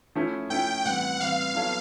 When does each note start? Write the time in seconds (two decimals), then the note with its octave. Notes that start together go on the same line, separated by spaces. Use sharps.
0.15 F3 A3 C#4 E4
0.50 F3 A3 C#4 E4 G5
0.85 A2 E3 G3 C4 F#5
1.20 A2 E3 G3 C4 F5
1.55 F#3 B3 E4 A4 C#5